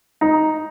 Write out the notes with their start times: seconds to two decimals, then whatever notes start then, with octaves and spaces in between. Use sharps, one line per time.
0.21 D#4